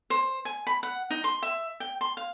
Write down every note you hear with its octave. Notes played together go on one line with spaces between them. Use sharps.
C5
G#5
B5
F#5
D#4
C6
E5
G5
C6
F5